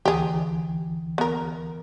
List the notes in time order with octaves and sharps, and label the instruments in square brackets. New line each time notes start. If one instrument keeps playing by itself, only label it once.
[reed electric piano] D2 E3 [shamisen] G4 G#4
[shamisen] B3 A#4